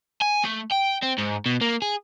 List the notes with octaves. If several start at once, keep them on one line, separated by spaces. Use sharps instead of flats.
G#5
A3
G5
C4
G#2
B2
A#3
G#4